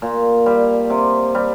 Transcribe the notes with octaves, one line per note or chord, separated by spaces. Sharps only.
A#2
G3
C3
G3